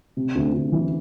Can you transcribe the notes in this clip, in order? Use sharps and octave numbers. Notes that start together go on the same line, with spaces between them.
C3
D2
D2
E3